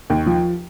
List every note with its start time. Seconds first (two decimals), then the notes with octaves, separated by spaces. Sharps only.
0.10 D#2
0.26 F3